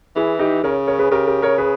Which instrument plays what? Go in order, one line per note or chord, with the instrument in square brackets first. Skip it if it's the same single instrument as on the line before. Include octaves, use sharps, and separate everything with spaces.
[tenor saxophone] E3 [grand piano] E4 G#4
[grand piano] D#4 G4
[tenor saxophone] C#3 [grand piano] A#4 C#5
[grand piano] A#4 C#5
G#4 B4
[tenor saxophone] C#3 [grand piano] G4 A#4
[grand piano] G4 A#4
A#4 C#5
G#4 B4